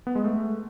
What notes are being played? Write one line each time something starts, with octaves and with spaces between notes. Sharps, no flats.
B3
G#3
A3